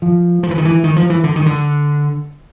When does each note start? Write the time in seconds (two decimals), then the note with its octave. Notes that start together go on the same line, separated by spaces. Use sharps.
0.02 F3
0.43 F3
0.51 E3
0.58 D#3
0.65 E3
0.84 D#3
0.96 F3
1.10 E3
1.24 D3
1.36 D#3
1.46 D3